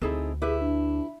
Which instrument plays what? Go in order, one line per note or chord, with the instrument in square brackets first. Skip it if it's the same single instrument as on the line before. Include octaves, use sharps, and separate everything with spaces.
[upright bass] D2 [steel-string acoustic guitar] C4 D#4 [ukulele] E4 G#4 A4
[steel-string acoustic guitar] E4 [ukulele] G4 B4 E5 [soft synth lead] G#4
[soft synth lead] D4